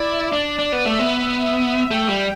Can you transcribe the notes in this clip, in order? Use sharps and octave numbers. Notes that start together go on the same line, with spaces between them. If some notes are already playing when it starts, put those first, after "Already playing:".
Already playing: E4 D5
D4
D4
B3
A3 E5
B3
A3 G5
G3